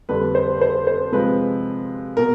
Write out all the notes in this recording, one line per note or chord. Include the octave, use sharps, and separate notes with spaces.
F2 D3 G3 B4
C5
C5
C5
C3 F3 G#3 B4
B2 A#4